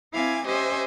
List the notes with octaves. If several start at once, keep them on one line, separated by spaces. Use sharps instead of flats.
C4 E4 F5 G#5 D6 G#6
C#4 G4 C5 D#5 E5 G#5